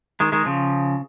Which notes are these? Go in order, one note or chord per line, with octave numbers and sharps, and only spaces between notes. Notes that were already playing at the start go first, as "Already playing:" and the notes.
D#3 G#3
D#3 G#3
C#3 F3